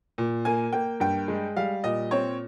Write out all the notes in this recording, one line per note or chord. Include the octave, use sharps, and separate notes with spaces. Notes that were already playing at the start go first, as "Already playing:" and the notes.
A#2
A#3 G#5
A#3 G5
G2 G5
G#3
G3 F5
A#2 D#5
C4 C#5